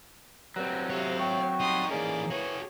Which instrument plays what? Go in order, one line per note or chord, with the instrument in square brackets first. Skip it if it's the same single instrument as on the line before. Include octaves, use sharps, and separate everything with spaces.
[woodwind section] G2 [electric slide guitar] F#3 C4
[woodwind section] C3 [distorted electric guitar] C#5 E5 [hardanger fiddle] F5
[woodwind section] G5 C#6
[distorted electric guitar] G3 D#4 [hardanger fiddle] C6 D#6
[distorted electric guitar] E3 C#4 [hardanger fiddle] A#3 D5 [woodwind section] D#4 G#4
[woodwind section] A2 E3 [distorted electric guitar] F#4 G#4 [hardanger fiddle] C#5